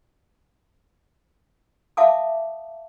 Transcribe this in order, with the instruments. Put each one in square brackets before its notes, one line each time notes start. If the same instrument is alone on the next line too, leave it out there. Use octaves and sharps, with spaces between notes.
[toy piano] E5 F5 A5 D6 D#6